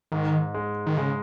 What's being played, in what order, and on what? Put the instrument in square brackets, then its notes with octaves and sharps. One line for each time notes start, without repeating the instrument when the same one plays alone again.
[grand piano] G#2 [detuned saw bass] D#3
[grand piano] G#3
[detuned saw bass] D#3
[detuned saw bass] C#3 [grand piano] G#3